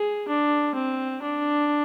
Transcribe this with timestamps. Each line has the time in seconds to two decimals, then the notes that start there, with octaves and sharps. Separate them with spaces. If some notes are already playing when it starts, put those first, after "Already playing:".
Already playing: G#4
0.28 D4
0.75 C4
1.22 D4